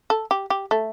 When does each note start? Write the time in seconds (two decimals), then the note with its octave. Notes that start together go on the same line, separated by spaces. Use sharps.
0.10 A4
0.31 G4
0.50 G4
0.71 A3